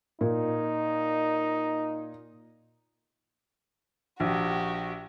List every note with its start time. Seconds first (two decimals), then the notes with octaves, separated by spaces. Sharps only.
0.21 A#2 D#4
4.20 A#1 F#4 G4